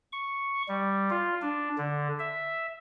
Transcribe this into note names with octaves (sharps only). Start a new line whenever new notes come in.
C#6
G3
F4
D4
D3
E5